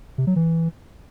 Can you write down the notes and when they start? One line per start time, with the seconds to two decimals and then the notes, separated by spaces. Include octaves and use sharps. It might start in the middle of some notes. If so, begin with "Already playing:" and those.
0.18 C3
0.27 F#3
0.36 E3